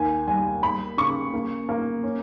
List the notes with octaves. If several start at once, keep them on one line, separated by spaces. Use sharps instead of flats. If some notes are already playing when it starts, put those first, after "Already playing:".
Already playing: D#2 G#5
G3 G#5
A#3 B5
C#3 C#6
A#3
A#3
C#4